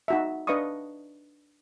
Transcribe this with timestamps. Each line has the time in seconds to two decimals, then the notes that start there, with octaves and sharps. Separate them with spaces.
0.08 D#4 F#4 E5
0.47 D4 B4 D#5 F5 C#6 D#6